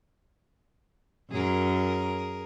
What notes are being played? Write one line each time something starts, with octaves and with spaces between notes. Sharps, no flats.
F#2 G#4 A#4